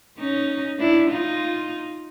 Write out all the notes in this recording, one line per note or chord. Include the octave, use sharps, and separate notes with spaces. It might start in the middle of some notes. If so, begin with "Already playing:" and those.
C#4 D#4
D4 E4
D#4 F4